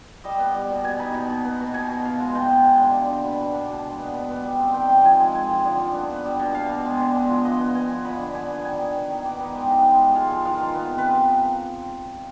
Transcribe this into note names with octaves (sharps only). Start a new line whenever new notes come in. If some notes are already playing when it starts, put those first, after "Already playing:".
G3 D#5
B3
G3
B2
B2 G#5
D#4 B5
B2
B2
B3
B2
B2 G#5
B2
B2 F5
G#3
B2 G5
B2
G#3
D3
D3
D3
B2 B5
B2
D4 G#5
B2
G#3
B3
B3
B3
G3
C4
D#3 G5
D#3
F3 G#5
G#3
G#3 G#5
F3
D3
D3
B3
B3
G3
B2
B2 F5
B2
G#3
D3
G#3
F3
B3 D#5
B3
B3 G#5
F3
D3 B5
D3
D3 G#5
B3
D#3 G#5
B3
D#3
D#3
B3 D5
D#4 B4
G#3 G4
D#4
G#3
G#3
G#3 F4
F3
D#3 F4
D#3
B3
C3
B4